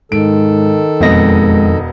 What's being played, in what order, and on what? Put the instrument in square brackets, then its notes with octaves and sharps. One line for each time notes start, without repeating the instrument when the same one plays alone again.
[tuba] G#2 [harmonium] D#3 A4 [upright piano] D7
[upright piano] E1 B3 D#5 [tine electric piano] F2 A#6 [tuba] G#3